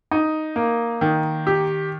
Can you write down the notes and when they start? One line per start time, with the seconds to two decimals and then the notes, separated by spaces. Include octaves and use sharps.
0.11 D#4
0.56 A#3
1.01 D#3
1.47 G4